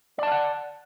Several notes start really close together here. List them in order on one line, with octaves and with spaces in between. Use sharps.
D5 A5 F5 F#5